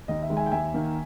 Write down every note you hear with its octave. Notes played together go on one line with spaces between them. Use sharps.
D#2 D#5
E5
D#3 G#3
E5 G#5
G5
D#2 E5 G#5
D#3 A#3